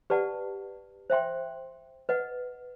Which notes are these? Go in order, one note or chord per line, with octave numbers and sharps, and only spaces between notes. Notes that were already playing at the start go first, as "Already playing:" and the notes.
G4 B4 D5 F#5 A5
C5 E5 G5 C6
B4 D#5 F#5